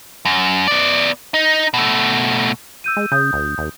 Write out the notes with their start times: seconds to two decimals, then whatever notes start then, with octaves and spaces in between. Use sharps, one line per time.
0.25 F#2
0.68 B3 D5
1.34 D#4
1.74 B2 A3
2.84 E6 G6 D#7
2.97 G#3
3.12 C#3 D#6 G6
3.33 D2
3.58 D#2